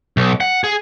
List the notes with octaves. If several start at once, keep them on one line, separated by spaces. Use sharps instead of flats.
B1
F#5
G#4